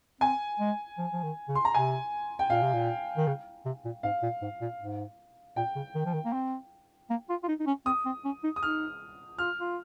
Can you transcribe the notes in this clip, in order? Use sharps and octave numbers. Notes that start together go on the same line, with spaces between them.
C4 G#5
G#3
F3
F3
D#3
C#3
C6
A#5
C3 G#5
G5
A#2 F5
C3
A#2
D#3
C#3
C3
A#2
G#2 F5
A#2
G#2
A#2
G#2
A#2 G5
C#3
D#3
F3
D#3
A#3
C4
A#3
F4
F4
D#4
D#4
C#4
C4 D#6
C4
C#4
D#4
D#6
D#4 F6
F4 F6
F4